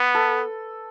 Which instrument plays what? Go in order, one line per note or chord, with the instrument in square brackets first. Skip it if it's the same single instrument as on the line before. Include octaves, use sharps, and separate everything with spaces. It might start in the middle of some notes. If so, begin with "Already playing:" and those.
Already playing: [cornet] B3 [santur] B4
[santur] A4